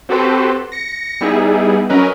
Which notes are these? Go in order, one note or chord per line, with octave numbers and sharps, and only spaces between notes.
C4 F#4 G4 A4 B4 C5
A#6 C#7
G3 B3 D#4 E4 G#4
F#3 C#4 A#4 B4 D#5